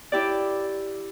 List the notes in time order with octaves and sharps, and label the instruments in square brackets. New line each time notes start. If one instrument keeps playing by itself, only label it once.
[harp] E4 G4 D5